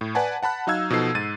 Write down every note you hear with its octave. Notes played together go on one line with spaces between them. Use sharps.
A2
B4 D5 F#5 G#5 A5
F#5 A5 B5 F#6
F#3 D#4 F5 E6 G#6
B2 F3 D#4 A4 C7
G#2 A6 D#7